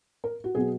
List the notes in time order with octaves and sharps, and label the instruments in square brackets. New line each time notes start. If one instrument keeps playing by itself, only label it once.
[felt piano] A#4
F#4
B2 F#3 B3 G#4